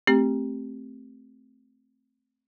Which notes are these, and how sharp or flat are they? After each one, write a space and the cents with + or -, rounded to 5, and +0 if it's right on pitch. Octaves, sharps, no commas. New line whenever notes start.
A3 +0 C4 +0 G4 +0